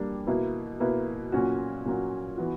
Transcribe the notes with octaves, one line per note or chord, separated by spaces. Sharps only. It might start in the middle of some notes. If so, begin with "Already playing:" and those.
Already playing: G3 A#3 D4
B2 A#3 E4 B4
B2 A#3 E4 B4
A#2 F#3 A#3 C#4 F#4
A#2 F#3 A#3 C#4 F#4
E3 B3 F#4